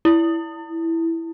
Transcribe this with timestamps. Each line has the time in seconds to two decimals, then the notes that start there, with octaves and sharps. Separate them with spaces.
0.05 E4